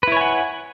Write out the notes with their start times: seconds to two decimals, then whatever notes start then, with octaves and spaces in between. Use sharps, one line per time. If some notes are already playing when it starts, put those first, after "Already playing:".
0.03 B4
0.08 E4
0.12 C#5
0.17 G#5
0.21 F#5